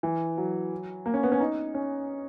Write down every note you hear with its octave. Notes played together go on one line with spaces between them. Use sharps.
E3
F#3
A#3
C#4
B3
C#4
D#4
C#4